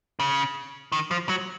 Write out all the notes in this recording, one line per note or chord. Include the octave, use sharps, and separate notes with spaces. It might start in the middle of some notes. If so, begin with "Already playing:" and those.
C#3
D#3
F3
F#3